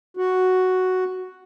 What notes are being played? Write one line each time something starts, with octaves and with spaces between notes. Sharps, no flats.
F#4